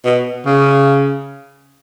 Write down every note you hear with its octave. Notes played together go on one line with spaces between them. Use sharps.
B2
C#3